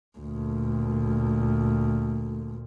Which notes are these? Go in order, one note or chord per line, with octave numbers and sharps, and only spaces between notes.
D2 A#2